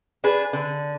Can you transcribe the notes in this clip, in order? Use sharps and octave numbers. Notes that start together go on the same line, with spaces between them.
D4 G#4 B4
D3